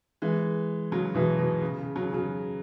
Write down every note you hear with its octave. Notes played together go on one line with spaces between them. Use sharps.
E3 G#3
C#3 F#3
B2 E3
B2
C#3
C#3
C#3 F#3
C#3 F#3